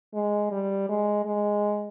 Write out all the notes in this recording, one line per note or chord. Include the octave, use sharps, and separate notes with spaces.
G#3
G3
G#3
G#3